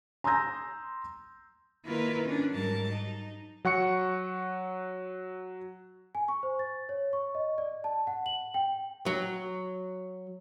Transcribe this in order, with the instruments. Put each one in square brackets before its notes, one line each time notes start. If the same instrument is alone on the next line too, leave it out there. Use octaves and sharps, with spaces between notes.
[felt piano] A#5 C6 D#6 E6 G6 A#6
[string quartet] D#3 A#3 E4 F4 A#4 B4
C#4 D4
G#2 F#3 G3 A#4 A5
D#4
[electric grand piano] F#3 F#5 C#6 C#7
[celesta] G#5
C#6
C5
A6
C#5
C#6
D#5
D5
A5
F#5
F#7
G5
[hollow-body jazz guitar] F#3